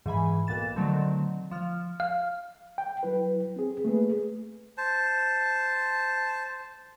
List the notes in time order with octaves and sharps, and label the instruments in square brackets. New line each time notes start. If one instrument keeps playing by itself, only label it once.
[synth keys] G#2 E3 G#5 B5
B1 A#2 B3 A6 E7
D3 D#3 F#3 A3 C4
F3 F6
[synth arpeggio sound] F5
[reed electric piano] G5
F#3 E4 B4
C4 G#4
A3 A#3 G#4 B4
[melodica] C5 A5